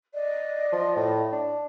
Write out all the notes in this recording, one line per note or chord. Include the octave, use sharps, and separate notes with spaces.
D5 D#5
F3
A2
D4